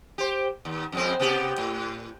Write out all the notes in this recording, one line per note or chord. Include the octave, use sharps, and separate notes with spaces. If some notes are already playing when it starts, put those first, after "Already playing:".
G4 C5
D#2
F2 G#3 C4
C3 B3 G4
A2